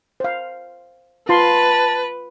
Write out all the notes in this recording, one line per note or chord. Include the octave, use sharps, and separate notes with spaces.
C5 F5
F4 B4 A5 C6